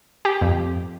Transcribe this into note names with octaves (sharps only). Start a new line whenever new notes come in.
G4
F2